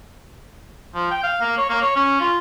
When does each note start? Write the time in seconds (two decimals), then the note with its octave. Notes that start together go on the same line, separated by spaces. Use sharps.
0.95 F3
1.11 G5
1.23 F5
1.41 A#3
1.57 C#5
1.69 A#3
1.82 C#5
1.96 C#4
2.20 F4